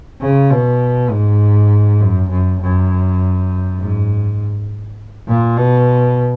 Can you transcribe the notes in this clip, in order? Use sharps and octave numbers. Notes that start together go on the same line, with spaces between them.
C#3
B2
G#2
F#2
F#2
F#2
G#2
A#2
B2